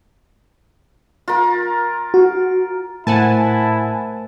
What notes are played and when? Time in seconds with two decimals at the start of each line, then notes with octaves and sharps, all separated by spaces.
1.28 F4 A#4
2.14 F#4
3.07 A2 A3 E4 A#4 C5 F#5 G#5 A5